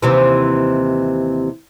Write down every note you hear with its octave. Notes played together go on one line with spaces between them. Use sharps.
D#2 C3 E3